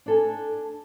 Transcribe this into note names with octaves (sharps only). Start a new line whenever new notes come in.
D4 A4 G#5